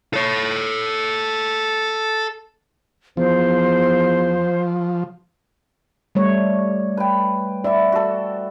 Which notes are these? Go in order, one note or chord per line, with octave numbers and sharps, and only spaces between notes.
A4 C#5
E2 F3 C5
G3 A3 C#5
B4 G5
E4 D5 E5
F#4 A4